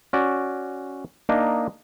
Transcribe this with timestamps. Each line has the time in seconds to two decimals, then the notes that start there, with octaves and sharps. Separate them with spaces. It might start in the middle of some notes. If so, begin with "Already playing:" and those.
0.13 C#4 F#4 D5
1.29 A#3 D4 D#4 D#5